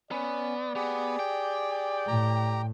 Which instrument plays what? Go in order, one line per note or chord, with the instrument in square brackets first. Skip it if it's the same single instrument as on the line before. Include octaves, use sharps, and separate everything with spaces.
[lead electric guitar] B3 [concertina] C#4 [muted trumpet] D5
[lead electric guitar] B3 [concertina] G4 G#4
[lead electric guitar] G5
[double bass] A2 [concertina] G4 A#5